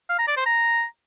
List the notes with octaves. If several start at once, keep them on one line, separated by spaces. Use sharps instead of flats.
F5
A#5
D5
C5
A#5